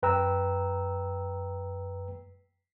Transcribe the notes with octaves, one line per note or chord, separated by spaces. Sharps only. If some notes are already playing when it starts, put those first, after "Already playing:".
F#2 B4 G5 A#5 E6